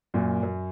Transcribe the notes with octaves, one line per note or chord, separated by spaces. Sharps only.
F#2 A#2
F#2